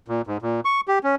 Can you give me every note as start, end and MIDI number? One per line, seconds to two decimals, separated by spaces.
0.08 0.22 46
0.27 0.37 44
0.42 0.60 46
0.65 0.81 85
0.88 0.99 67
1.04 1.15 61